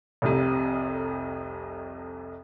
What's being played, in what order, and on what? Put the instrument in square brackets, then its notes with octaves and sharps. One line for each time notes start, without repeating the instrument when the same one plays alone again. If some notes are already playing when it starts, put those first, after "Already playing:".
[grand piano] F1 C2 F2 C3